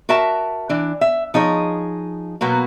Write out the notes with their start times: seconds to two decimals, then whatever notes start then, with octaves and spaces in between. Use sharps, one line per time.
0.09 F#4 A#4 E5 A5
0.69 E3 D4
1.01 E5
1.34 F3 D#4 G#4 C#5
2.41 B2 F#3 A#3 B3